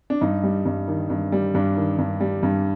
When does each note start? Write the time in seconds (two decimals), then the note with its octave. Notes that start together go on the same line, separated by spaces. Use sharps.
0.10 D4
0.21 G2 D#4
0.43 G3
0.65 G2
0.88 D#3
1.10 G2
1.32 G3
1.54 G2 D4
1.77 D#3
1.98 G2
2.21 G3
2.43 G2